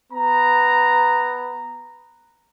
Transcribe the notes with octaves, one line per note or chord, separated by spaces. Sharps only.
B3 A#5